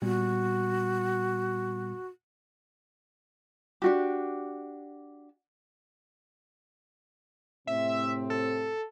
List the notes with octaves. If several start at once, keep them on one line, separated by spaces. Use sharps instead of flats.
A#2 G3 B3 F#4
D4 F#4 G4
A2 C3 C4 E5
A4